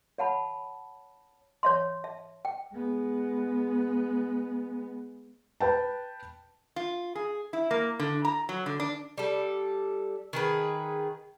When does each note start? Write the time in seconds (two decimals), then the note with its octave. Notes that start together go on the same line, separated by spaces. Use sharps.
0.18 C#5 F#5 A5 B5
1.63 C#5 E5 C6
2.04 E5
2.45 G5
2.74 G#3 B3
5.60 B4 G5 A5
6.76 F4
7.15 G#4
7.53 E4
7.71 A#3
8.00 D3
8.25 A#5
8.49 F#3
8.66 D3
8.80 D4
9.18 G3 A4
10.33 D#3 G#4 B4